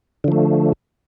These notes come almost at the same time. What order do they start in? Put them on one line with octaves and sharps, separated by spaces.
D3 F3 A3